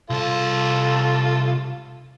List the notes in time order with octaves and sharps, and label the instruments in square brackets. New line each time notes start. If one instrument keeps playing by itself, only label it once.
[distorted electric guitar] C2 A5 [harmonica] F4 A4